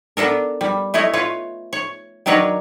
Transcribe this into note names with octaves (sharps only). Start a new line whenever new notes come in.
B3 D4 A4 A#4
G3
A3 E4 C#5 D#5
F4 B4 C#5
C#5
D#3 F#3 D4 A#4 B4 C#5